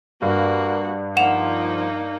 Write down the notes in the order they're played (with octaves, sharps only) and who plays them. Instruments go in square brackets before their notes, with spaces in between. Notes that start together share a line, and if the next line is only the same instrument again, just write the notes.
[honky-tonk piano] G2 [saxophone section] A#3 [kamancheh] F#4
[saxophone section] F3 [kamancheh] A#3 D#4 [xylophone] F#5 E7 F7